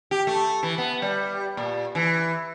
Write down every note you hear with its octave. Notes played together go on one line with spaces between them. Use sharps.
G4
A3
E3
B3
G3
A#2
E3